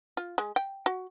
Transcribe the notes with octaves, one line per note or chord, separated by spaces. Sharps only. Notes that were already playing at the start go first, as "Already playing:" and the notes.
F4
G#3
G5
F#4